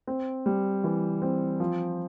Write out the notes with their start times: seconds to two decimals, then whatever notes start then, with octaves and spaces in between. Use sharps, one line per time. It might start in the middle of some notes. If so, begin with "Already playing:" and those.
0.07 C4
0.46 G3
0.84 E3
1.22 C4
1.60 F3